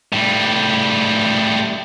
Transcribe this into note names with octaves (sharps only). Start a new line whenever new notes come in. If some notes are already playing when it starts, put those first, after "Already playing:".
A2 G3